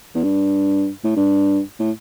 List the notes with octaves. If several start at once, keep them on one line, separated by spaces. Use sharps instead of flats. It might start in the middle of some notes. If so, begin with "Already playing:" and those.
E2
G2
A2
G2
A2